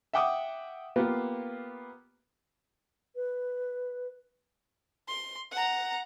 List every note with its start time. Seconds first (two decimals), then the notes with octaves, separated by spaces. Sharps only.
0.13 E5 F#5 G5 D6 D#6
0.96 A#3 B3 F4 G4
3.15 B4
5.08 C6
5.52 F#5 A#5